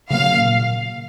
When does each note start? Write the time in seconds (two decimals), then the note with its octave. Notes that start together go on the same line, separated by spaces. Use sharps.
0.10 C#3 F#3 A#3 F5
0.38 A#2